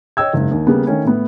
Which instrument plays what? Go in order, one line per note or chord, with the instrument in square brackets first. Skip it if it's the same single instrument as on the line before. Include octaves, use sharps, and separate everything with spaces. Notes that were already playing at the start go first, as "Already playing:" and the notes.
[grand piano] C#5 D#5 G5 E6 G#6
F#1 G#2
D#2
C#3 G3 A#3 B3
D#3 A3 C#4
A2 B3